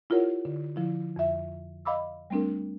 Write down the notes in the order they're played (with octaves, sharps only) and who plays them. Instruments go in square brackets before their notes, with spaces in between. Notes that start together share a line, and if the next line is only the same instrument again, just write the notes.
[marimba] E4 F4 G4 A#4 C#5 F#5
D3
D3 F3 E4
F2 E5
D#5 F5 B5 D6 E6
G3 A3 C4 D4 A#4